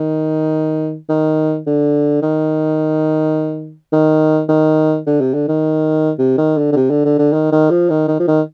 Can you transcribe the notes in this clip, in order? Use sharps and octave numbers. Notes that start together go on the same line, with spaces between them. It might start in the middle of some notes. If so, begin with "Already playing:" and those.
Already playing: D#3
D#3
D3
D#3
D#3
D#3
D3
C3
D3
D#3
C3
D#3
D3
D3
C3
D3
D3
D3
D#3
D#3
F3
D#3
D#3
F3
D#3